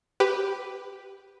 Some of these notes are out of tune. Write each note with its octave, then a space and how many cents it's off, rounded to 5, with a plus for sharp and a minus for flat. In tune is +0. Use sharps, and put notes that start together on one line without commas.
G4 +0 B4 +0